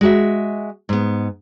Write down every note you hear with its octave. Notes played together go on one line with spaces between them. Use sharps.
G#3 F#4 E5
G#2 B3